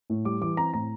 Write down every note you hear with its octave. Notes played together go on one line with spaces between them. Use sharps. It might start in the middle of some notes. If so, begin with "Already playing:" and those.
A2
G3 D6
E3 D6
C4 A#5
A2 A#5